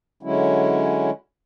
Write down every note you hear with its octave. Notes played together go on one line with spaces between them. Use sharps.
D3 F#3 G#3 C#4 E4